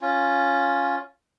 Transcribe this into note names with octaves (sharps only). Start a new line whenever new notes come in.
C#4 F4